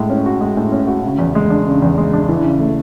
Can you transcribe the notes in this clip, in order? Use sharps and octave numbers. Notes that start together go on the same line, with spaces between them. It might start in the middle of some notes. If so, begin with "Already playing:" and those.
Already playing: A2 G#3
C#4
F#4
G#3
A2
C#4
F#4
C#3
E2
G#3
D4
C#3
E2
G#3
D4
E3
C#3
A3